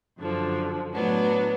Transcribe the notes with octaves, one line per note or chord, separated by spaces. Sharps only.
F#2 D3 F3
A2 F#3 B3 D4